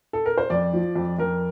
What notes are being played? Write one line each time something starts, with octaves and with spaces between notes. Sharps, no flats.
A4
A#4
C5
F2 D5
F3
F2
F2 A#4